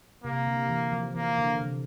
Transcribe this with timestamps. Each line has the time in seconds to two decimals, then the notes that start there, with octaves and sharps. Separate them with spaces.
0.24 C3 A#3
0.47 D3
0.69 E3
0.92 F3
1.15 E3 A#3
1.38 D3
1.61 C3